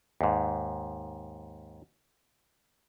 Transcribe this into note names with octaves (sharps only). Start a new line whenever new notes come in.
D#2 G#2